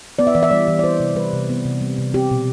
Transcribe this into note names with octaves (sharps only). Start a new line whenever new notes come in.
B3 D5
E5
E3 D5
E5
G3 D5
E3
D5
B3 C5
C3
G3 B4
C3
B3
C3
G3
C3
C4 G4
B2